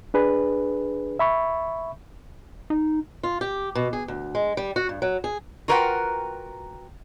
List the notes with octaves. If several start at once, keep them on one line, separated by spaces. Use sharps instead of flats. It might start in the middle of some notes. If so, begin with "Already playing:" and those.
D4 G#4 B4
E5 B5 C#6
D#4
F4
G4
B2
G#4
D2
G#3
G3
F#4
G2
F#3
G#4
F4 F#4 A#4 B4 F#5 G5